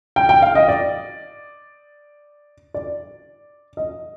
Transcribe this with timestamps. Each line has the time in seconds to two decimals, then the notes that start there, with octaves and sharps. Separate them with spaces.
0.16 G5
0.29 G5
0.42 F5
0.55 D#5
0.68 D5
2.74 D5
3.77 D#5